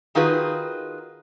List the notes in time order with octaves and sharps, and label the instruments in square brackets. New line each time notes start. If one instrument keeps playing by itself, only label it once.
[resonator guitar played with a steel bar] D#3 D#4 F4 F#4 G#4 B4